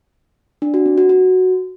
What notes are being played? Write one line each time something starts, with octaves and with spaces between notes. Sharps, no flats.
D4
F#4
C4
F#4
F#4